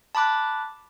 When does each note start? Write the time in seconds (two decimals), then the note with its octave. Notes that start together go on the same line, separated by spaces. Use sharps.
0.15 A5 B5 D6 F#6